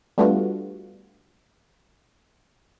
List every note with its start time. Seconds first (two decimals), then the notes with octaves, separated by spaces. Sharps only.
0.18 G3 A3 B3 D4 F4 F#4